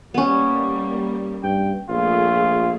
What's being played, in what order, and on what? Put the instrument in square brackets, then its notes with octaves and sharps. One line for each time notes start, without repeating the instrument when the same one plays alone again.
[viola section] G3 A#3 [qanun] B3 C#4
[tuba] G2 [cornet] G5
[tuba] A#1 [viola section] A3 G#4 [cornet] F4